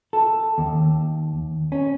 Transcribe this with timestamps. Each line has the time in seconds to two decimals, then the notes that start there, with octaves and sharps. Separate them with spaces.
0.13 A4
0.58 D#2
1.72 C#4